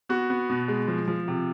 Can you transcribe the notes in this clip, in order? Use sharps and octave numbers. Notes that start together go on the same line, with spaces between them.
B3 F#4
B3
B2
G#3
F3
F3
C3